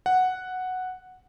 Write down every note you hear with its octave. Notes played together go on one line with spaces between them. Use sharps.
F#5